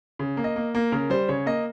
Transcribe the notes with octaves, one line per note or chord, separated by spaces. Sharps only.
C#3
A#3
D#5
A#3
A#3
C#3 A#4
G3 C5
C#3 C#5
A#3 D#5